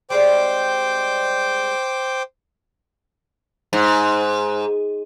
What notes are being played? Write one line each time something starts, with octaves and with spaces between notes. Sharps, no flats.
G3 G#3 C4 C5 G5 D6
G#2